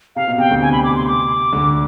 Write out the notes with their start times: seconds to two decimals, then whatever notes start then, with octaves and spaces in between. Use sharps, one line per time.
0.16 C3 F5
0.27 B2
0.38 C3 G5
0.50 D2 D3
0.61 G#5
0.72 B5
0.84 D6
0.96 C6
1.07 D6
1.52 D2 D3